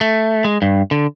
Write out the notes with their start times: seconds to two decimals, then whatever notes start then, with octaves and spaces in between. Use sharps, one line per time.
0.01 A3
0.45 G#3
0.62 G2
0.91 D3